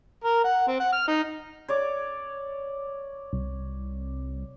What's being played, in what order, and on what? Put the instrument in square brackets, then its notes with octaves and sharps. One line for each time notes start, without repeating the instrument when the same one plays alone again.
[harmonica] A#4
F#5
C4
F#5
F6
D#4
[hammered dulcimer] C#5 D5 D6
[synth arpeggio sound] C2